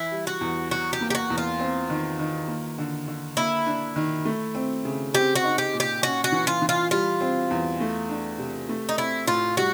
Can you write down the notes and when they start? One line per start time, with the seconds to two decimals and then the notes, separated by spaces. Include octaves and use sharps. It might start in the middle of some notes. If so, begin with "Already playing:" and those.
Already playing: E3 E4
0.11 G3
0.27 F#4
0.41 E2
0.71 F#3 F#4
0.93 G4
1.01 A#3
1.10 G4
1.15 F#4
1.30 E2
1.38 F4
1.60 C4
1.90 D#3
2.19 D#3
2.48 A#3
2.78 D3
3.08 D3
3.37 A#3 E4
3.66 D4
3.96 D#3
4.25 A3
4.55 C4
4.85 C#3
5.14 C4 G4
5.36 F#4
5.44 D#4
5.58 G4
5.73 A#2
5.80 G4
6.03 C#4 F#4
6.24 F#4
6.32 E3
6.47 F4
6.62 E3
6.69 F4
6.91 G3 F4
7.21 C4
7.51 E2
7.80 A3
8.09 D4
8.38 C3
8.69 A3
8.89 D#4
8.98 C4 E4
9.27 A2 F4
9.57 G3 F#4